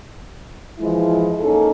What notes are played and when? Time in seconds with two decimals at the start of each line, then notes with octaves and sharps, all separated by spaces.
0.79 E3 F3 G#3 E4
1.40 A#3 C#4 D#4 A4